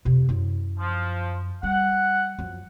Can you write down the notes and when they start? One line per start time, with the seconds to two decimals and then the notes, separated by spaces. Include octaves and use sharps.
0.05 F2 C3
0.29 F#2 E4
0.79 F3
1.63 G3 F#5
2.38 F#2 F3